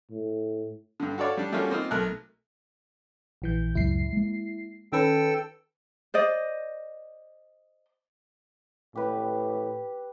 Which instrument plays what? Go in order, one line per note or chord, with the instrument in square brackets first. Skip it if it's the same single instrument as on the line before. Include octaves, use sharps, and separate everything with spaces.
[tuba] A2
[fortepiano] G2 D3
F#4 A4 C#5 D5 F5
G3 D4
G3 A3 A#3 C#4 F4 F#4
A#3 C4 D#4 F4
B1 A3 A#4 F#6
[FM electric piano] A#1 E3 G6
[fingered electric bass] C#2 F#2 A2 [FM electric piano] E4 C7
[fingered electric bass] G#3 A#3
[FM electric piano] D#3 C#4 B4 [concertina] A4 G5 E6
[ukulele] C5 D5 D#5
[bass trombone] A2 [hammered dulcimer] G4 B4